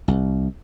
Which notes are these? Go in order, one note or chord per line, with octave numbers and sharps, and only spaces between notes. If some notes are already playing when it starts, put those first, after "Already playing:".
C2